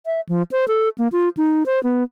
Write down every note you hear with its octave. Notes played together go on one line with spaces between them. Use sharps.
E5
F3
C5
A4
A#3
F4
D#4
C5
B3